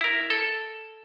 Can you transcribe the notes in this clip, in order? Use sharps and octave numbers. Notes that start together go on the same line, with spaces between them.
E4 A#4
A4